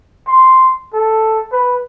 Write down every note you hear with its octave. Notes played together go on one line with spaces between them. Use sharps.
C6
A4
B4